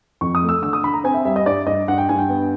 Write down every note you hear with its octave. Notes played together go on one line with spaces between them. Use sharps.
F2 C#6
D#6
A3
E6
D3 E6
D#6
D3 B5
A#5
C4 G#5
E5
G3 E5
D#5
G2 D5
G2 D#5
G2 F#5
G5
G2 G#5
G5
B3